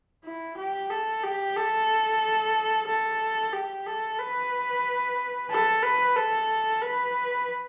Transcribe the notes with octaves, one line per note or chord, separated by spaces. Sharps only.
E4
G4
A4
G4
A4
A4
G4
A4
B4
A4
B4
A4
B4